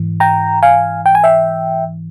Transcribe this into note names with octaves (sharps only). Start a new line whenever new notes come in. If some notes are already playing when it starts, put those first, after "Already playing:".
Already playing: G#2 E3
G5 A#5
F5 G#5
G5
G#5
E5 G5